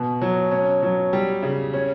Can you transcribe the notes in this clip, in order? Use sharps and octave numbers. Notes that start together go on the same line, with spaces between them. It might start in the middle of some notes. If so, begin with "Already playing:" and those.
Already playing: B2
F#3
C#4
F#3
G3
C#3
C#4